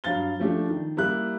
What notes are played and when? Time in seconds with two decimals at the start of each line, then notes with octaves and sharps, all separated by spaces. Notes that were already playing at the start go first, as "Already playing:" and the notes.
0.04 G2 F#3 F5 A6 G7
0.39 F3 A3 D4 G4
0.69 D#3
0.97 G3 A#3 E4 G4 F#6